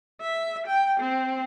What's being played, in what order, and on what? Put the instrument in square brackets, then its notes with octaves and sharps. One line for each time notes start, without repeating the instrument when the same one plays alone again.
[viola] E5
G5
C4